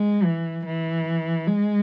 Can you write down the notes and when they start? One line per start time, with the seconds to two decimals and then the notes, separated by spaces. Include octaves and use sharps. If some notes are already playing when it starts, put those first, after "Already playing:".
Already playing: G#3
0.24 E3
0.66 E3
1.47 G#3